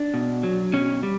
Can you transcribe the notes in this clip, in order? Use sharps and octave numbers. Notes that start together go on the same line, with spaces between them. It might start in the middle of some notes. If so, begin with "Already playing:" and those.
Already playing: D4
B2
F#3
B2 C#4
G3